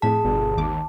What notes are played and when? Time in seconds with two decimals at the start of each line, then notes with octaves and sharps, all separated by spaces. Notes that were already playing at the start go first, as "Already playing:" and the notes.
0.02 F2 A2 G#4 A5 B6
0.25 G1 B2
0.57 G#1 D#2 D6